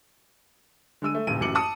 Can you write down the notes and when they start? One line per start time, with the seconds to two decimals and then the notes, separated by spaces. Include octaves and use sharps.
1.02 D3 G#3 E6 D#7
1.14 A3
1.27 D#1 A1 C#3 D#7
1.40 A1 F#2 F#4 D6 C#7 F#7
1.55 A5 D#6 C#7